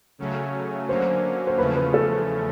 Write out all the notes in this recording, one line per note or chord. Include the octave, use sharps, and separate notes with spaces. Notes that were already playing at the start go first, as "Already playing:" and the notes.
C#3 F#3 A3 C#4
D3 F#3 A#3 C#4 C5
C5
E2 C#3 F3 A3 C#4 B4
B4
A4